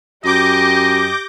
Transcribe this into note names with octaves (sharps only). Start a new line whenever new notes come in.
F#2 G4 D#5 D6 G6 A#6